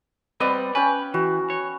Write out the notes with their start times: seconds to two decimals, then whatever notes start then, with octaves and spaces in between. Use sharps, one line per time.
0.40 G3 B3 C4 D5 D#5 F5
0.75 C#4 B4 G5
1.14 E3 F#4
1.50 C#5